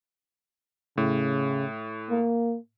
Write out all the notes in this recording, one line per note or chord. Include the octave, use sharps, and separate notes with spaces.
A2 C#3
A#3